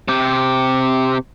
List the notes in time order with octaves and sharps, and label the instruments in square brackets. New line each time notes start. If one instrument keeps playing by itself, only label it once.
[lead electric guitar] C3 G4